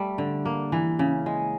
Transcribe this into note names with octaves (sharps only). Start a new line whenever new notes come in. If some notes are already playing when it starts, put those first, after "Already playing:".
Already playing: G3 A3
D3
A#3
E3
C#3
G#3